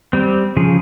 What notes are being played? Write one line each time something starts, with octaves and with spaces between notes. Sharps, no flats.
G3 C4
C#3 F3 G#4